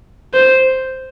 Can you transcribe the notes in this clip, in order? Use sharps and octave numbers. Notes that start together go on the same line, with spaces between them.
C5